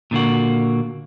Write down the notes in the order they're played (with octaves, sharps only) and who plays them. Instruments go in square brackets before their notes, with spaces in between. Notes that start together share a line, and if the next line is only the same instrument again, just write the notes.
[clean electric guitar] A#2 D3 A#3 F#4